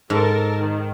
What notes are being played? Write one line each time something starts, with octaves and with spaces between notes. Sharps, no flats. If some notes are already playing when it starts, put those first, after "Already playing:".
G#2 A4 A#4 A5
D#3